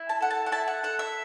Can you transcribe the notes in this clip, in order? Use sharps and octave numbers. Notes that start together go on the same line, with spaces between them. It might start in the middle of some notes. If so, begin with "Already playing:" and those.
Already playing: E4
A5
A4 F#5
A5
F#5
E4 A5
F#5
A4 F#5
E5